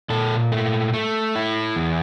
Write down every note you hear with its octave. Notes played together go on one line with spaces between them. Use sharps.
A#2 A4
A3
A3
E4
E2